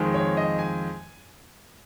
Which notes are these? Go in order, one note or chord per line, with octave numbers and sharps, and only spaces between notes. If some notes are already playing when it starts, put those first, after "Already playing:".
Already playing: F2 D#3 G#3
C#5
D#5
G#5